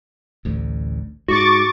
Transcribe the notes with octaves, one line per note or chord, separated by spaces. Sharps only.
A1 D2
G#2 F#4 C#6 D6 A6